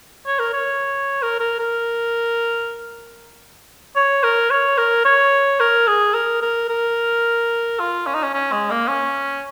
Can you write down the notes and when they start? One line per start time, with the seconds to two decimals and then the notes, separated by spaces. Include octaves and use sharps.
0.27 C#5
0.39 A#4
0.53 C#5
1.22 A#4
1.40 A#4
1.59 A#4
3.96 C#5
4.23 A#4
4.50 C#5
4.78 A#4
5.05 C#5
5.60 A#4
5.87 G#4
6.14 A#4
6.42 A#4
6.69 A#4
7.80 F4
8.07 C#4
8.15 D#4
8.23 C#4
8.34 C#4
8.52 G#3
8.71 A#3
8.88 C#4